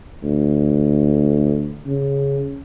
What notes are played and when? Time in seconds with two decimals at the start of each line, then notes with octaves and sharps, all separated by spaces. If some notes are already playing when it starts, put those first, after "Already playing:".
0.23 D2
1.87 C#3